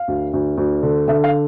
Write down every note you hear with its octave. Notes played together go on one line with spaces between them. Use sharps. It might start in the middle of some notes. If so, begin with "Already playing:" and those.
Already playing: F5
D2
D2
D2
D3
D3 E5
F5